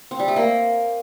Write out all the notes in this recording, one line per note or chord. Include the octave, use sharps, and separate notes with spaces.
C4
G3
A3
A#3